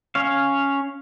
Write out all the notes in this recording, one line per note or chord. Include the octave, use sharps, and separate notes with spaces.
C#4 C#5 F5